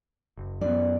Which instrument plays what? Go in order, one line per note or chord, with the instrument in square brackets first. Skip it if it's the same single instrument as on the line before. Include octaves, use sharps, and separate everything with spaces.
[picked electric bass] F#1
[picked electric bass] F#2 B3 [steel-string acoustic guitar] D5